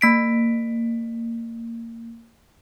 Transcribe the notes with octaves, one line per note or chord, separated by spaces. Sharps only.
A#3 B6 D7